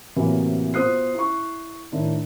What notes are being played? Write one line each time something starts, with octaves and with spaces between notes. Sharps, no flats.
A2 C3 E3 F#3 A#3
B2 F4 C5 D#6 F#6 C7
E4 C#6
A2 D#3 D4